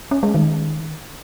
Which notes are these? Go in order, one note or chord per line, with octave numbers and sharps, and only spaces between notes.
C#4
G#3
D#3